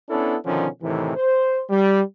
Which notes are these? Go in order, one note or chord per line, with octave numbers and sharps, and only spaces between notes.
B3 C#4 D4 E4 A4
B2 D3 D#3 F3 C#4
A2 C3 D#3 E3
C5
G3